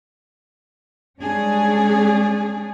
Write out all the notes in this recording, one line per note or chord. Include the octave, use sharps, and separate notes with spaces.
G3 G#3 C#4 D4 G#4